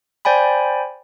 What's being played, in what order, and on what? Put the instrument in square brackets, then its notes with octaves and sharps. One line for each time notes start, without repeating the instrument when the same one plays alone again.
[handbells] C5 D5 G5 G#5 B5